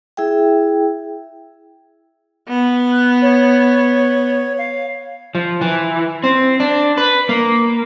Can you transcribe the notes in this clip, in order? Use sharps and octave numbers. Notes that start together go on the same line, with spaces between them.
E4 G#4 E5 G5
B3
F#6
C#5
F5
F3
E3
C4
D4
B4
A#3